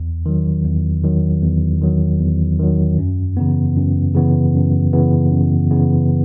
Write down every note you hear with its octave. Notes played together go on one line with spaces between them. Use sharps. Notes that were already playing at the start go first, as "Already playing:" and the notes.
Already playing: E2
D#3 F#3
E2
D#3 F#3
E2
D#3 F#3
E2
D#3 F#3
F#2
C#3 E3 B3
F#2
C#3 E3 B3
F#2
C#3 E3 B3
F#2
C#3 E3 B3